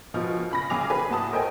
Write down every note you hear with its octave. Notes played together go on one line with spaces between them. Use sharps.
F#1 B2 F3 D#5 F6
C#3 B5 A#6
B1 F#2 C#3 G#4 D6 F7
G#4 B4
A2 F#4 A5 D#6
A4 A#4 C5 D#5 G5 G#5